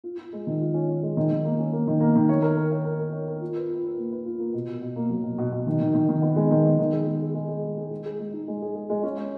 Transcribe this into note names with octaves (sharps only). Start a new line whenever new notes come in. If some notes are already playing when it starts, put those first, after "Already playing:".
F4
F4
G#3
D#3
F4
C#4
C#4
G#3
D#3
D#3
A#3
C#4
A#3
D#3
A#3
D#3
C#5
A#4
A#4
C#5
A#4
A#4
C#5
A#4
F4
B4
F4
B4
A#3
B4
F4
A#3
B2
B2
B2
A#3
F#3
B2
B2
B2
D#3
D#3
D#3
D#3
B3
G#3
D#3
B3
D#3
G#4
G#3
G#4
G#3
G#4
G#3
G#4
G#3
G#4
G#3
D#4
G#3
G#4
G#4
G#3
C#4
C#5